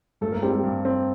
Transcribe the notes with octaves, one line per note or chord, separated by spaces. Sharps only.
G2 A3 A4
A#3 A#4
G3 C4 G4
G3 G4
G2
C4